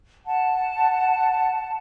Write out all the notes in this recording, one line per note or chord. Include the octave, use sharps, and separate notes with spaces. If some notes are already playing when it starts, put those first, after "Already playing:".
F#5 A5